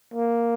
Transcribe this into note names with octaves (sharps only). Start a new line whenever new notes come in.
A#3